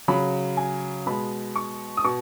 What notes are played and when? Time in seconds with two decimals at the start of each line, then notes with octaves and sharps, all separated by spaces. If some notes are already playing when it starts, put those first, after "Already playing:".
0.08 C#3 F#3 B5
0.57 G#5
1.06 B2 G#3 B5
1.56 C#6
1.97 D#6
2.04 B2 C#6